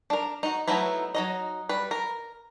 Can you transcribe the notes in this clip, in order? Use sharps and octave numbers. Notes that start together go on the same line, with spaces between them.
D4 A#4
D#4 F#4
F#3 A3 B3 D#4 E4
F#3 D#4 D#5
G3 B4
A#4